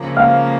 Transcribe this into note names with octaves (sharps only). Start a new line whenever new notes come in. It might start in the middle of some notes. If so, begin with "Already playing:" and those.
Already playing: C#3 F3 A#3
F5 F6